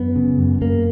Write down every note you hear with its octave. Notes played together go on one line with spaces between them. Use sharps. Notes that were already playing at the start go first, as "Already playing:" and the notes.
Already playing: F#2 B3
C#3
F#2
F#2 A#3